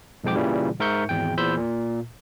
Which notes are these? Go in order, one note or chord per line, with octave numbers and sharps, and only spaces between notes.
B1 F2 G#2 G5 D6
A#2 C#3 E3 G3
G#2 A#4 E5 C#6 G6 C#7
G#1 E2 G5
E2 A#2 C5 B5 E6 G6
A#2